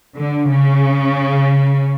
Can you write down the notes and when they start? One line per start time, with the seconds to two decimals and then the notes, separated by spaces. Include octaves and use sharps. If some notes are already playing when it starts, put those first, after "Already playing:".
0.18 D3
0.50 C#3